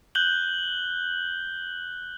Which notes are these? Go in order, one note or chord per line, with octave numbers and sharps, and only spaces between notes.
F#6 G6 F#7 G7